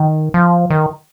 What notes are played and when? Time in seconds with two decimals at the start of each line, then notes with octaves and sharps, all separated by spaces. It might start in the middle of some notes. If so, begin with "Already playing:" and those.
Already playing: D#3
0.34 F3
0.70 D#3